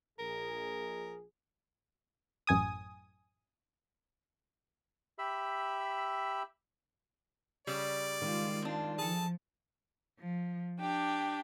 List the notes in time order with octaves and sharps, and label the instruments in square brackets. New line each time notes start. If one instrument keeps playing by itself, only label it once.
[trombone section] A#1 G#4 [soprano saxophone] A#4
[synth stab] A1 F#2 G#5 D#6
[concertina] G4 E5 B5 E6
[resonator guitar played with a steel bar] C#3 G3 [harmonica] D5
[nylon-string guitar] D#3 [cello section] G#3 F4
[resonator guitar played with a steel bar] C4 D4
[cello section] F3 [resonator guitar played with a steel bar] G#4 A4 [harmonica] A5
[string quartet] F3
D4 G4 G5